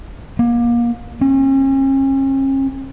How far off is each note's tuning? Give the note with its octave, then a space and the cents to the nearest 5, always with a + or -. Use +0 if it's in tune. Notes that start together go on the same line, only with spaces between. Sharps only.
A#3 +30
C#4 -40